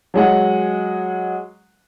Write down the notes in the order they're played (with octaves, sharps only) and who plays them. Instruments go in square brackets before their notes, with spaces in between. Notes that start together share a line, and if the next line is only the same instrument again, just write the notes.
[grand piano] F#3 G#3 F#5